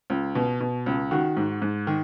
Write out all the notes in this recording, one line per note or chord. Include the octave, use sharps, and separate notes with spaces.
C#2
B2
B2
C#2
D#3 F#4
G#2
G#2
D#3